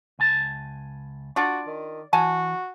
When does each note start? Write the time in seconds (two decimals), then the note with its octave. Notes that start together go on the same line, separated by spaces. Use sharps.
0.19 C#2 G#5 A5
1.36 D4 F4 F#4 D5
1.67 D#3
2.13 E3 F#4 G#5 A5